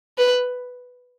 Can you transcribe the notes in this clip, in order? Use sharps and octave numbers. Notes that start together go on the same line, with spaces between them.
B4